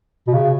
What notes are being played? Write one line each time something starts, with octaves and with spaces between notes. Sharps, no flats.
B2
C#3